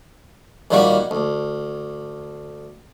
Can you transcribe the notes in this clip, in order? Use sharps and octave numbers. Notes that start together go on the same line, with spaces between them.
D#2 A#2 D#3 G3 A#3 F#4
D2